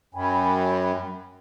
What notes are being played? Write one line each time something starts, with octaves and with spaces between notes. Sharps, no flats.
F#2 G5 G#5 B5